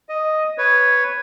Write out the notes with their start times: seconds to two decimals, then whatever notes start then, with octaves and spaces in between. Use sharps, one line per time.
0.09 D#5
0.58 B4 C#5